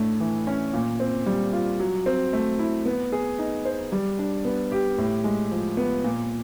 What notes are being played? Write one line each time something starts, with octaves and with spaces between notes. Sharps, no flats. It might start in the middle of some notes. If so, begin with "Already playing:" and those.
Already playing: A2 A3 D4
E3
C#4
A#2
C4
G3
F4
F#3
C4
A3
E4
B3
G#4
D#4
C5
G3
D4
B3
G4
A2
G#3
F3
B3
A#2